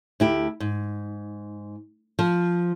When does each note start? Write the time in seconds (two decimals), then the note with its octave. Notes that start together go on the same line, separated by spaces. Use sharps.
0.20 D2 E4 G4
0.60 G#2
2.19 F3